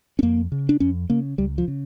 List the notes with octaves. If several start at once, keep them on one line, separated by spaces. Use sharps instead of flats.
C#4
F2 A#3
C#3
D4
F2 C#4
C#3 A#3
C#2 G3
F3
C#3